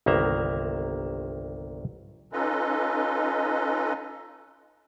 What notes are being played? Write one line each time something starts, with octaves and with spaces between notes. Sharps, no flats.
G1 C2 D#3 A#3 E5 A#5
C#4 D#4 F4 A4 B4 D#5